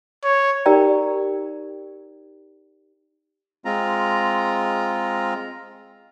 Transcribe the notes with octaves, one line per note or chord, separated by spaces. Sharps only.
C#5
D#4 G4 A#4 D5 G5 A#5
G#3 C4 F4 A#5